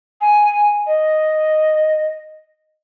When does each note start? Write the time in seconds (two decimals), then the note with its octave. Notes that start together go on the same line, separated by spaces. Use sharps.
0.21 G#5
0.87 D#5